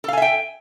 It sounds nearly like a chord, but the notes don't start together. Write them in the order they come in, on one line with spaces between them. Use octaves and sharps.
A4 F5 G#5 E5 G5